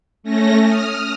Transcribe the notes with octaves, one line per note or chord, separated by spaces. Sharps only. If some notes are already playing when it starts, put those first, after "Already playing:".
A3 C#4 A#6
D#6 F6